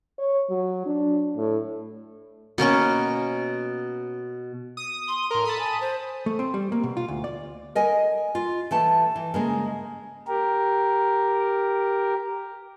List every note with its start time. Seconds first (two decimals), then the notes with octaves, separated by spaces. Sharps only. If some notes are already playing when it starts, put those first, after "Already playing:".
0.19 C#5
0.50 F#3
0.86 D4
1.37 A2
2.58 B2 A#3 C#4 C#6
4.77 D#6
5.08 C6
5.31 A2 A#4 C6
5.45 A4 A5 B5 D#6
5.59 G#5
5.81 C5
6.26 A3
6.39 C4
6.54 G3
6.72 A#3
6.83 B2
6.97 F4
7.08 D2
7.24 D5
7.75 A#4 D#5 G#5
8.35 F4
8.71 E3 A3 A5
9.16 E3
9.34 C#3 G#3 A#3
10.28 G4 A#4